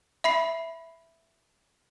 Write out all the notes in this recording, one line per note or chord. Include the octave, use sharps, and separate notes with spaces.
E5 B5 C7